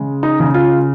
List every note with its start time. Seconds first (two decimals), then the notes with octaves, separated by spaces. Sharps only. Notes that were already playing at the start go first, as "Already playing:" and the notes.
Already playing: C#3 G#3
0.23 D#4
0.40 C#3
0.54 F4